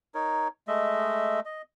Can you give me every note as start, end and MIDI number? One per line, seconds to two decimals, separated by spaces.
0.15 0.48 63
0.15 0.48 70
0.15 0.48 73
0.68 1.40 56
0.68 1.40 57
0.68 1.40 75
0.68 1.40 76
1.45 1.62 75